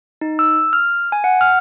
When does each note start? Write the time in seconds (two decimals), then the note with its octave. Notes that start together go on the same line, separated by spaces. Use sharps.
0.21 D#4
0.39 E6
0.73 F6
1.12 G#5
1.24 F#5
1.41 F6